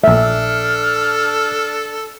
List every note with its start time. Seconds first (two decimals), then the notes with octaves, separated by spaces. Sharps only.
0.04 A#1 A3 D4 A4 E5 F6